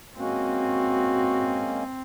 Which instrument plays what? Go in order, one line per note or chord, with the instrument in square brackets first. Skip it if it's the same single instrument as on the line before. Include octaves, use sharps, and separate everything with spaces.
[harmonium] G#3 A#3 C#4 [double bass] C4 [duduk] F#4